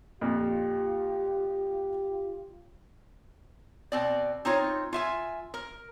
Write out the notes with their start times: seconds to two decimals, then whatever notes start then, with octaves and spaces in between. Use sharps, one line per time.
0.21 F2 A#2 F4 G4
3.92 B2 C4 D5
4.45 C4 D#4 F4 C#5
4.93 F4 E5 G#5
5.54 A#4